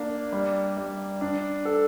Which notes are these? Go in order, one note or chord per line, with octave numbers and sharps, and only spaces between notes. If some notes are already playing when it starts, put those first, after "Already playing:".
Already playing: A#3 D4
G3
G3
D4
A4